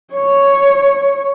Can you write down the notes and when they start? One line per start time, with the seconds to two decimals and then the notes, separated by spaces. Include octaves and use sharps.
0.14 C#5